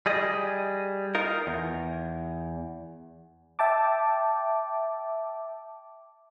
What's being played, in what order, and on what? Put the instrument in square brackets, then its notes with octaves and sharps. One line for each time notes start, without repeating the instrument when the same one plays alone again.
[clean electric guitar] G3 G#4 D#5
D#4 F4 A#4
E2
[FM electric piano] E5 G5 A5 D6